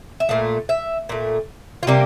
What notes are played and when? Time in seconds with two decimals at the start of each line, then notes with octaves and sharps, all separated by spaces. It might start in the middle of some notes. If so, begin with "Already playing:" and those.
0.20 E5
0.29 A#2 A3 F5
0.69 E5
1.09 A#2 A3
1.83 F4
1.87 C3 G3 A#3 G4